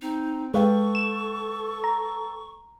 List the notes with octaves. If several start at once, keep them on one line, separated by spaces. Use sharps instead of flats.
C4 D#4
G#3 A4 B4 F5 G5 C#6
E7
A#5